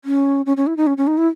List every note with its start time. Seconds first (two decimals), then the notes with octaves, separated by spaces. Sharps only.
0.05 C#4
0.46 C#4
0.57 C#4
0.67 E4
0.77 D#4
0.87 C#4
0.98 C#4
1.07 D#4
1.18 E4